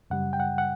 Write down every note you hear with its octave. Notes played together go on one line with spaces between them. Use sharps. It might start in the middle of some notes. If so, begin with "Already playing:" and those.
F#2 C#3 G3 F#5
G5
F#5
F#5